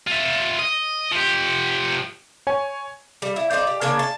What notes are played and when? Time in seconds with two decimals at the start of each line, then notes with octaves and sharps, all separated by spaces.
0.07 F4 E5
0.59 D#5
1.12 F3 G4
2.47 C#5 G#5
3.22 G3
3.36 E4
3.51 D#4 G4 C5 D5
3.67 G4
3.81 C#3 A#3 D4 G#5
3.99 A5